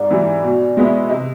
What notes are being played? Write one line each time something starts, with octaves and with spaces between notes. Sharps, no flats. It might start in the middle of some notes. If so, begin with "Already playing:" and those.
Already playing: G#2 D5
E3 G3
B2
G#3 B3 E4
C3 D#5